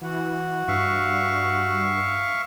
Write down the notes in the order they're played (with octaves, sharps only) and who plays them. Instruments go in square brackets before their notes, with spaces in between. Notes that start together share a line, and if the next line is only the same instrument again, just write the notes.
[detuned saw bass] E3 [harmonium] F#4 F#5
[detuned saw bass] G2 [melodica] E5 F5 C#6